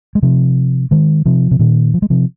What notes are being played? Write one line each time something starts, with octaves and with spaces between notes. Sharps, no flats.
G#3
C3 F3
D#3 G#3
C3 F3
C3
A#2 D#3
F3
G#3
C3 F3